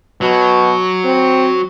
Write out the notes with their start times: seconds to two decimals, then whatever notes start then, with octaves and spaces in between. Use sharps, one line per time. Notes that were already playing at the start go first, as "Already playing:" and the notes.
0.21 B2 F#3
1.05 C4